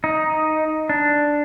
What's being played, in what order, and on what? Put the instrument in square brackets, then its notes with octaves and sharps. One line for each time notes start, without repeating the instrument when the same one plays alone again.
[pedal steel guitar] D#4
D4